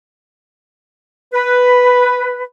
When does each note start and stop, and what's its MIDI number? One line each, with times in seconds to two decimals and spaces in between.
1.34 2.45 71